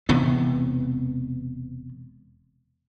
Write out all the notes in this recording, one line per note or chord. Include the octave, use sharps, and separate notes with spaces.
E1 C3 E3 B3